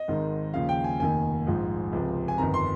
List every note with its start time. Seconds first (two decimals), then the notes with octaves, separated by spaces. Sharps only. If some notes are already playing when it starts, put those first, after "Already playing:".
Already playing: D#5
0.08 G#1 G#2 D#3
0.54 D#2 C#3 F3 F5
0.69 G5
0.84 G#5
1.00 F1 D#2 D#3 G#5
1.46 A#1 G#2 F3
1.92 C#2 C3 F3
2.28 G#5
2.38 G1 F2 D#3 A#5
2.54 C6